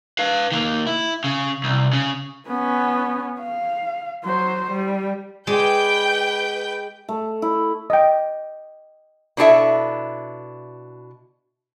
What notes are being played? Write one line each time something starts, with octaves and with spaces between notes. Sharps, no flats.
B4 F5
D#3 A#3
E4
C#3
C2
C#3
B3 C#4
F5
F#3 C5
G3
G#3 B4 D5 G5 G6
A3
E4
D#5 G5
B2 D4 E4 G4 A4 E5